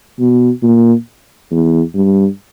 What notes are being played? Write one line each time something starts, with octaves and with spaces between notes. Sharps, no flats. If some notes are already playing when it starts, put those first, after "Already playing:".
B2
A#2
E2
G2